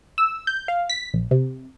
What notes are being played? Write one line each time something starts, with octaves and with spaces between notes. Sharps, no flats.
E6
G6
F5
B6
A#1
C3